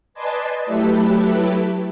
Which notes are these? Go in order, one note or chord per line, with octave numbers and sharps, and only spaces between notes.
B4 D5 D#5 G#5 A5 C6
F#3 A3 E4 G4 A4 B4